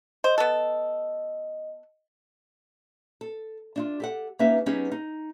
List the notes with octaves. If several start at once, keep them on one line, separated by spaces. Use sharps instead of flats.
C5 D#5
B3 A4
A4
D4 D#4 F4
G4 A4 F#5
A#3 C#4 D#4 G4 B4 E5
F#3 B3 C#4 D#4 G4 G#4
D#4